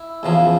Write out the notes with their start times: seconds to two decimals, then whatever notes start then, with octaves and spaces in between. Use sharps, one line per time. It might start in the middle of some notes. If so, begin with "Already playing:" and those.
Already playing: E4
0.23 E2 C#3 F3